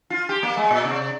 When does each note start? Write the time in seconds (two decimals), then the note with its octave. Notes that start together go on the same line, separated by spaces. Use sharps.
0.10 F4
0.29 G4
0.43 A#3
0.57 G#3
0.71 A#2
0.85 C3